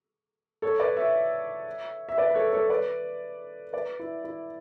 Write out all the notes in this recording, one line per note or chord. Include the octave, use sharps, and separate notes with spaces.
A4 C#5
B4 D5
C#5 E5
E5
B4 D5
B4
A4 C#5
A4 C#5
B4 D5
B4 D5
E4
E4